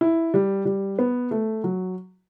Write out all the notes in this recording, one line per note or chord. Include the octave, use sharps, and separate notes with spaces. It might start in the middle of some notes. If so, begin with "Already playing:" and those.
E4
G3
G3
B3
A3
F#3